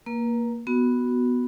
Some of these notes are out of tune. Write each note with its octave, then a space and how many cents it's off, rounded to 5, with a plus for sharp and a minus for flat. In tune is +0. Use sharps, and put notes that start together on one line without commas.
A#3 +0 B4 -45
B3 +0 F#4 +0